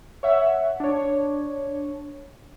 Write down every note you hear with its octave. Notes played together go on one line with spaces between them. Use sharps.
C#5 E5 F#5
D4 C#5